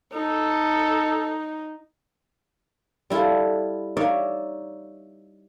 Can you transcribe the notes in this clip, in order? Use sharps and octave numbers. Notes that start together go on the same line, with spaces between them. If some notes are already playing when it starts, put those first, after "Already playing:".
D#4 A4
G3 E4 F4 A4
D#4 C#5 D5 E5 F5